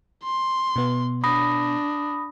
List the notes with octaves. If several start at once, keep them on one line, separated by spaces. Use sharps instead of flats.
C6
B2 B3
D4 B5 D#6 A#6